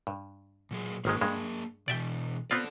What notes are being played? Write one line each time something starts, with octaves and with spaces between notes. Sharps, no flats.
G2
A#2 F#3 G#4
G#1 D#3 G#3 A#3 G#4 A#4
G2 G#3
B2 E3 D5 E5 G5
B3 C4 F4 A4 D5